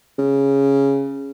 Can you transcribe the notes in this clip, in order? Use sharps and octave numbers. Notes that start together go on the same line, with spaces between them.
C#3